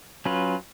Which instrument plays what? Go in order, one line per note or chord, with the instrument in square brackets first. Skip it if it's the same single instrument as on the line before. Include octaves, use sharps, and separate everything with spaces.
[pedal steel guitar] F#3 C#4 F4 B4